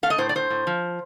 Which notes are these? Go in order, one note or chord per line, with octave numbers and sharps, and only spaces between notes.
A3 F5
D#5
A2 C5
D5
A2 C5
A2
F3